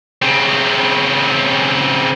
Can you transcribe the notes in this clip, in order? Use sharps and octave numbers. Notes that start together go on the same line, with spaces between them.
C#3 C4